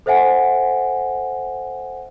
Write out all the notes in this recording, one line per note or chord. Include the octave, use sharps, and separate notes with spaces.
A4 C5 E5 F#5 G#5